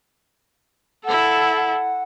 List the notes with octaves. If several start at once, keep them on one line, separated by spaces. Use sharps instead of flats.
E4 A4 F#5
F#5